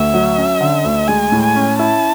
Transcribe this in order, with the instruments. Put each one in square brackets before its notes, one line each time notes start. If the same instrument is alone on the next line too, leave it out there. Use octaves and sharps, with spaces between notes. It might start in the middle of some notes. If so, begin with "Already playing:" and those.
Already playing: [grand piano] D2 [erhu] E5
[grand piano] F#3
C#4
D3
D2
[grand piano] G#3 [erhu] G#5
[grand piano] A2
[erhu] G#5
[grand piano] C#4
[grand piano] E4 [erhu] A5